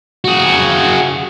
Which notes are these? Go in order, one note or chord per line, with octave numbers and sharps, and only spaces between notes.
F#4 G#4